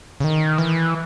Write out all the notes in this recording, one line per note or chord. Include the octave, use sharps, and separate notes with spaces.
C#3
D#3
E3